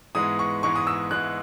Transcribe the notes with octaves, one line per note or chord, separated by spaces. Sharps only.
G#2 E3 G#3 B3 D#6
C#6
G#2 E3 G#3 B3 C#6
D#6
E6
G#2 E3 G#3 B3 F#6